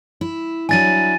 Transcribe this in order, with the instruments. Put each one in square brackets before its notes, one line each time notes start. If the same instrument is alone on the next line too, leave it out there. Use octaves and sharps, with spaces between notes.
[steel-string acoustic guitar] E4
[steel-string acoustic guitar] F#3 D4 E4 [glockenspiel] G#5 A6 D#7